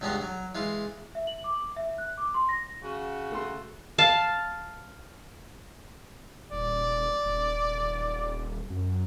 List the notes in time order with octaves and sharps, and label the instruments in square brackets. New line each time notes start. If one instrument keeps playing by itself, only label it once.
[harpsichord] C#2 G2 B3 C#4 A#5 C6
F#3
E3 G#3 F4
[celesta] E5
F#7
D6
E5
F#6
D6
C6
A#6
[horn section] C#3 F#4
[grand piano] A3 C6
[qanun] F5 A5
[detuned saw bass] D#1 [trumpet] D5
[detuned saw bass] D#1
F#2